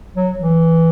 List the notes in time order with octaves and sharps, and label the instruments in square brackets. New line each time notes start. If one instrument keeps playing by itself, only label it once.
[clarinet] F#3
E3